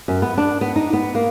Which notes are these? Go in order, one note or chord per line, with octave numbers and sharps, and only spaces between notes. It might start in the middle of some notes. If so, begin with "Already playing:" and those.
F#2
B3
D4
B3
D#4
B3
A#3